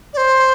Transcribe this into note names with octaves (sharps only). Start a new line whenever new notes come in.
D5
C5